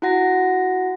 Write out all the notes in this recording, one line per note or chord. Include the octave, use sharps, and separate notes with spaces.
E4 F#4 F#5 A#6